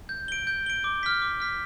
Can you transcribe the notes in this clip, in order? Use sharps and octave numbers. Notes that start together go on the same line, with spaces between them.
G6
D7 G7
G6
D7 G7
D6
F6 B6
D6
F6 B6